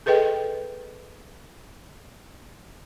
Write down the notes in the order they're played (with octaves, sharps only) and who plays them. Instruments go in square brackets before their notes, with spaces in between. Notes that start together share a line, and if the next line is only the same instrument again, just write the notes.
[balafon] G#4 A4 B4 D#5 G5